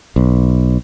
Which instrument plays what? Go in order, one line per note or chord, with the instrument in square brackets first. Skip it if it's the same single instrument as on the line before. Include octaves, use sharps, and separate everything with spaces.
[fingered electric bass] B1